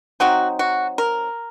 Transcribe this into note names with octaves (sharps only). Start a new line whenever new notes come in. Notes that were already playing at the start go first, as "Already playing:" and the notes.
F#3 C4 D#4 F#4
F#4
A#4